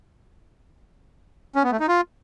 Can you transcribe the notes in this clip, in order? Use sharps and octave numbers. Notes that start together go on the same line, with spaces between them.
C#4
B3
A3
D#4
F4